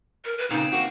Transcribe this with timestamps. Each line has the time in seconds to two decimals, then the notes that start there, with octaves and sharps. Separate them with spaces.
0.25 A#4
0.38 B4
0.50 A#2 C#3 C4 D#4
0.72 A#3 F#4